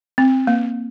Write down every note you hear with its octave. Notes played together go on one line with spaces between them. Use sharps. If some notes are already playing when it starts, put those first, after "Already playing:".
C4
A#3